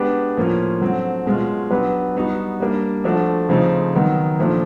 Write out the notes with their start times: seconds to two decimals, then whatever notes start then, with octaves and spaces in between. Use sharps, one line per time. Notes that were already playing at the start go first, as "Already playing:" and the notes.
Already playing: G#3 B3 D4 G4 B4
0.37 A2 F3 A#3 C#4 F4
0.81 D3 F#3 A3 C4
1.26 B2 G#3 C#4 F4
1.71 F#3 B3 D4 G4 B4
2.15 G3 B3 D#4 F#4
2.60 G3 A#3 D4
3.04 F3 A3 D4 F#4 A4
3.49 C#3 F3 A3 C4 D#4
3.93 D#3 F#3 B3 D#4
4.38 A#2 F3 A3 D4